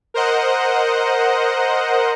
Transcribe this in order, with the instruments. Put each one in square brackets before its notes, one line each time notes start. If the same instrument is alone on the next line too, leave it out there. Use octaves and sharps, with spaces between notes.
[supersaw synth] A#4 C5 D#5 F#5